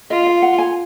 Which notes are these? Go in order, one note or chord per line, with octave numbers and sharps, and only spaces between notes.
F4 D#5
F5
F#5
G#5